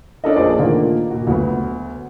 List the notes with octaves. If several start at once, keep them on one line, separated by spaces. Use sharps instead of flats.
C#4 D4 F4 A4 A#4 D#5
A#1 A#3 G#4 C5 D5
A#2 D3 D#3 A3 A#3 F4
A#2 F#4
D2 F#3 B3